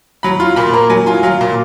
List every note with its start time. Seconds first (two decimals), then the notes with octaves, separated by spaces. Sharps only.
0.23 F#3 B5
0.40 F4
0.56 A#2 B5
0.73 A#3 A#5
0.90 F#3 G#5
1.06 F4 G#5
1.23 F#3 F5
1.41 A#2